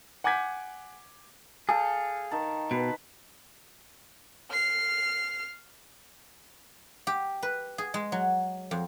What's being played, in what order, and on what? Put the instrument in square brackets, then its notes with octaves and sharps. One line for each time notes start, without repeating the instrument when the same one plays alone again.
[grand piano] F#5 G#5 D6 G6 G#6 B6
[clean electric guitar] G#4 [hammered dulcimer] A4 F5 G5
[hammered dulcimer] D#3 A5
[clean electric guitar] B2 [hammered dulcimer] B4
[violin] F6 C7
[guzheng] G4
B4
G#4
G#3
F#3
F2